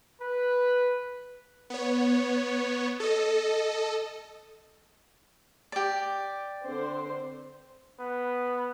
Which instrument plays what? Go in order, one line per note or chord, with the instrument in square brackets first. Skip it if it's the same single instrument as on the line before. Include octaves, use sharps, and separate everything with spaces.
[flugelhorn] B4
[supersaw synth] B3 C#5
A4 D#5
[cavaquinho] G4 D5
[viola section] D3 C4 C5
[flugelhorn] B3